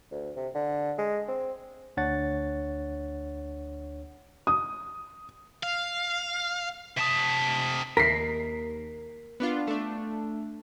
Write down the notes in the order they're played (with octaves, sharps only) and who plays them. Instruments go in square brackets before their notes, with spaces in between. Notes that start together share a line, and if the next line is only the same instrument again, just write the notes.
[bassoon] D2
C3
D3
G#3
C4
[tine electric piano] D2 D4 C#5 F#5 A6
[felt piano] D#6
[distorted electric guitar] F5
[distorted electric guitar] C3 A5 [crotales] D#6 B6
[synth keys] D#2 [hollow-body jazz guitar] A#4 [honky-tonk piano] B6 C7
[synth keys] B3 D4 F4
A3 D4